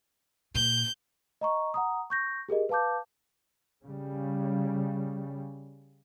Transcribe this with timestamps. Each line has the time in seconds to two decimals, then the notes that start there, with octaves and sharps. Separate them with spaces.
0.55 A#2 G6
1.41 D#5 A#5 C#6
1.74 F#5 A#5 D#6
2.10 C#6 G6 A#6
2.49 G4 G#4 A#4 D#5
2.69 B4 F5 A5 D6 G6
3.84 C#3 G3